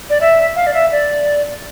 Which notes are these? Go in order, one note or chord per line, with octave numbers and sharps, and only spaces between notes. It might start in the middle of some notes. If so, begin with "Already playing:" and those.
D5
E5
F5
D5
E5
D5